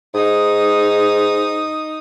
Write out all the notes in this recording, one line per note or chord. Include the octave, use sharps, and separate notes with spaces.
G#2 D#4 D#6